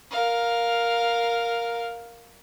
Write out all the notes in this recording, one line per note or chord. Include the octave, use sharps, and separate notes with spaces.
A#4 F5